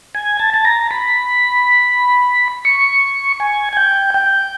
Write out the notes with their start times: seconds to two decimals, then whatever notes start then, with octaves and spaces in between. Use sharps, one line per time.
0.15 G#5
0.40 A5
0.54 A5
0.65 A#5
0.91 B5
2.65 C#6
3.40 G#5
3.73 G#5
3.77 G5
4.14 G5